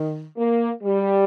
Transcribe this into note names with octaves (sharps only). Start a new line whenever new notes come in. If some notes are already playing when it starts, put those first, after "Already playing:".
Already playing: D#3
A#3
G3